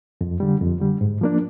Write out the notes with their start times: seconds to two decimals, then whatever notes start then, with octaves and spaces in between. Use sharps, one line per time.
0.21 F2
0.40 D3 G3
0.61 F2
0.80 D3 G3
1.01 G#2
1.21 F3 A#3 D4